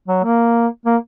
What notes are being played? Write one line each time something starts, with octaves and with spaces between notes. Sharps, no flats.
F#3
A#3
A#3